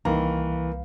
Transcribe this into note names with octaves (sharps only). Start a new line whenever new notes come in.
C2 D#3 E3 A#3 F5 A#5